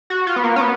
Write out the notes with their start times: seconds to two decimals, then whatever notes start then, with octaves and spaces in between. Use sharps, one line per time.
0.10 F#4
0.27 F4
0.36 B3
0.44 A#3
0.56 C#4
0.61 B3